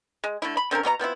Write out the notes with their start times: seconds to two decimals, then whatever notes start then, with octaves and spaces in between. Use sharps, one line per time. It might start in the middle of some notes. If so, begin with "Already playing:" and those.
0.24 G#3
0.42 D3 A3 E4
0.57 B5
0.71 D3 C4 C#4 A#4
0.83 B2 B3 C#4 A#5
0.99 F3 B3 C4 E4